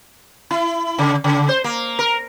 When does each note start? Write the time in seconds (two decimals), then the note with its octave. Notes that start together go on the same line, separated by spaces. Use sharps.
0.51 E4
0.98 C#3
1.24 C#3
1.49 C5
1.64 A#3
1.99 A#4